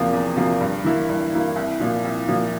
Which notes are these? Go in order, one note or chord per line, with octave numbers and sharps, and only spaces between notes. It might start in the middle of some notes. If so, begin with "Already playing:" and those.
Already playing: E2 C3 F3 A#3 F4
E2
C3 F3 A#3 F4
G2
E3 A#3 E4
G2
E3 A#3 E4
C2
A#2 F3
C2
A#2 F3